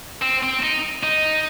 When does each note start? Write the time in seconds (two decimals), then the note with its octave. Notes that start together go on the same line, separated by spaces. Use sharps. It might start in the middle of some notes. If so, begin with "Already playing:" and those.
0.22 C4
0.43 C4
0.63 D#4
1.03 D#4